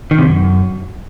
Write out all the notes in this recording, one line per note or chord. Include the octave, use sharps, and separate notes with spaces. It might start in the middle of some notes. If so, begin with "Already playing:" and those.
D#3
C3
F#2